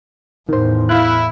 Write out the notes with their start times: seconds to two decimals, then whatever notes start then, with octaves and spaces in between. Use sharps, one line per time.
0.49 E2 A2 D#3 C5
0.89 E4 F5 F#6